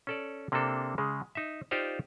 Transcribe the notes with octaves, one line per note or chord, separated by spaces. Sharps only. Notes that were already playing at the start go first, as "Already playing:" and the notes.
C#4 A4 D5
C3 A#3 C4 D4 A4
C#3 G#3
D#4 E5
D#4 F4 G4 C5 D5 F5